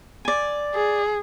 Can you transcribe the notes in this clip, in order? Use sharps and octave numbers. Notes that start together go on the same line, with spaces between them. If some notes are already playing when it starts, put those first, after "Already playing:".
D5 G#5
G#4